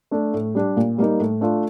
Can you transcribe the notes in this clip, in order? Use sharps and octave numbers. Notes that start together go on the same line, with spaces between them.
A3 D4
A2
G3 D4 G4
A#2
G3 A#3 D#4
A2
A3 D4 F4